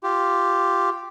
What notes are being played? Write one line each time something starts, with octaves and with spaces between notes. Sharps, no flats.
F4 G4